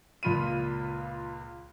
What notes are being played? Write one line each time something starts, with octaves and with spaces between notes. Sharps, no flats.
C#2 A#2 F4 B5 D#7